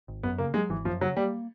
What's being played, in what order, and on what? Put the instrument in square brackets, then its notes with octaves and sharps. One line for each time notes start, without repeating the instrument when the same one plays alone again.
[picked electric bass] G#1
[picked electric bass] F#2 [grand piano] B3
[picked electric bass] C#3 [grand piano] A#3
[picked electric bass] F#3 [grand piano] G#3
[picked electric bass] G#1 [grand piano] E3
[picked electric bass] F#2 [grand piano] F3
[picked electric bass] C#3 [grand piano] F#3
[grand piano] G3 [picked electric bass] A#3